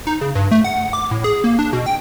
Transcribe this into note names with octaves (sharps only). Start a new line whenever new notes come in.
D#4
C#3
G2
A3
F#5
D6
A2
G#4
A#3
D4
B2
G5